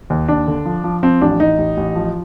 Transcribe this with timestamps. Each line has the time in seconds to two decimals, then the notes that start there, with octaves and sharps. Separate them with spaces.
0.10 D#2
0.28 D#2 D4
0.47 D3
0.65 F3
0.84 F3
1.03 F3 C4
1.21 A1 D4
1.40 A1 D#4
1.58 A1
1.77 A1
1.96 F3